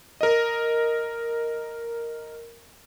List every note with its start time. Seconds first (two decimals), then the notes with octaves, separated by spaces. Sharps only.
0.21 A#4 D#5